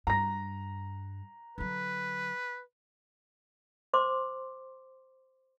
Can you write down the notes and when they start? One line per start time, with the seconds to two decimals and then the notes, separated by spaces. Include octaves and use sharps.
0.07 G2 A#5 A#6
1.58 D3 F#3 B4
3.93 C5 C6 D6